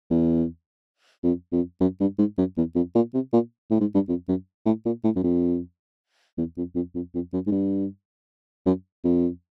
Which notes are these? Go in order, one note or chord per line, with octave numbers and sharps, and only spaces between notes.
E2
F2
F2
F#2
G2
G#2
F#2
E2
F2
A#2
C3
A#2
A2
G#2
G2
F2
F#2
A2
A#2
A2
F#2
F2
E2
F2
F2
F2
F2
F#2
G#2
G2
F#2
F2